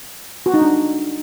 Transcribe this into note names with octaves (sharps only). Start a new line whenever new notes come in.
F#4
D#4
D4